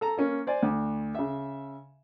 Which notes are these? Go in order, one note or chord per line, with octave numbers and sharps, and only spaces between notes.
A4 A#5
A#3 C#4
C5 D5 G#5
D2
C#3 E5